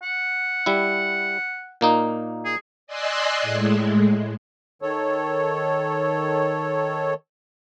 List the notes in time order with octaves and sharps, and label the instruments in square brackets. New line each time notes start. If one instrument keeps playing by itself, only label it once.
[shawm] F#5
[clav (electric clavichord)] G3 E4
A#2 A#3 D#4
[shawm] G#4
[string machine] D5 D#5 G#5 C6 E6 F#6
A2 G#3
[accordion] D#3 A4 C#5